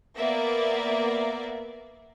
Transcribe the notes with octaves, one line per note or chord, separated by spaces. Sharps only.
A#3 B3 D5 E5